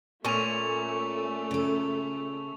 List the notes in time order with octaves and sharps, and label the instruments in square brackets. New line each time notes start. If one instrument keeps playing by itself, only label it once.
[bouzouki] A#2 C#4 [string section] A3 [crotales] C#6 F7
[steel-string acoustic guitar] C#3 A4